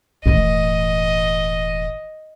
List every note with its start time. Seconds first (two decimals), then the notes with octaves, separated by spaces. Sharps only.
0.26 E1 A2 E3 D#5